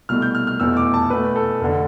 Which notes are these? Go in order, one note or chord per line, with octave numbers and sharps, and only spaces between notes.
C2 B2 A3 F6
G6
F6
F6
F1 E2 B2 A3 E6
D6
A5
E2 B2 A3 B4
A4
F1 D3